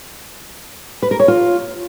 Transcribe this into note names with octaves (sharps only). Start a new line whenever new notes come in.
B4
A#4
C#5
F4